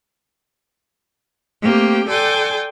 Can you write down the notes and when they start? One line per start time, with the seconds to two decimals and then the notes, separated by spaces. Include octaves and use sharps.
1.63 A3 A#3 C4 G4 G5
2.08 A4 D5 G5 G#5 C6 D6